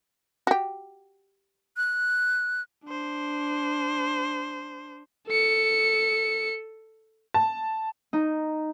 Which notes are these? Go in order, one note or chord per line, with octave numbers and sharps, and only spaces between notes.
F#4 G4
F#6
D4 C5
A4 C#7
A5
D#4